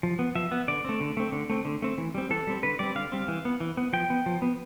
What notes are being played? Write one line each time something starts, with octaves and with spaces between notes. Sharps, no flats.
F3
B3
F3 E5
B3
D3 D5
A3 C4
D3
A3 C4
D3
A3 C4
D3
A3 C4
E3
G3 C4
E3 A4
G3 C4
D3 B4
G3 C4 D5
D3 F5
G3 C4
E3
B3
E3
B3
F3 G5
B3
F3
B3